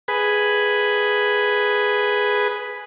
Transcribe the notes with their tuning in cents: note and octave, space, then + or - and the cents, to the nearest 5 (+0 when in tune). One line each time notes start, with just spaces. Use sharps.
G#4 +0 B4 +0